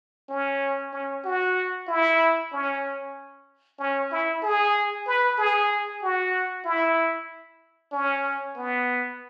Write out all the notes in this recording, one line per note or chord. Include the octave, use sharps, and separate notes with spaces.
C#4
C#4
F#4
E4
C#4
C#4
E4
G#4
B4
G#4
F#4
E4
C#4
B3